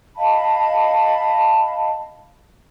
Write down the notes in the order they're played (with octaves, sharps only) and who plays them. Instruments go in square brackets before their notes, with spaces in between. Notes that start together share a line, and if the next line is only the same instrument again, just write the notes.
[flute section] D#5 F5 A5 B5